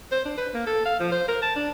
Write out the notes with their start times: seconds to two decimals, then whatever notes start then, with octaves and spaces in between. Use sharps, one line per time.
0.12 C5
0.25 D4
0.38 B4
0.54 A#3
0.67 A4
0.85 F5
1.00 F3
1.12 C5
1.29 A#4
1.42 A5
1.56 D4